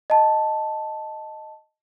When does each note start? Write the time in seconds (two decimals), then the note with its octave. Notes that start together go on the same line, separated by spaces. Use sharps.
0.10 D#5 A5